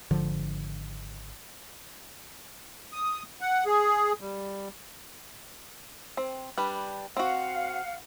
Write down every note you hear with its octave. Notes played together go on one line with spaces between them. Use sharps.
G#1 D3 F3
D#6
F#5
G#4
G3
C4
G3 D4 B4
C4 F#4 F5 F#5